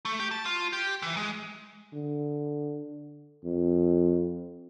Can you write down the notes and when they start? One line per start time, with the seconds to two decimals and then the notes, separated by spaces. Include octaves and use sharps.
0.05 A3
0.20 G4
0.31 A5
0.45 F4
0.73 G4
1.02 E3
1.17 G#3
1.94 D3
3.45 F2